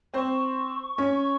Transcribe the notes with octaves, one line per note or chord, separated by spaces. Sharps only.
C4 C5 C#6
C#4 C#5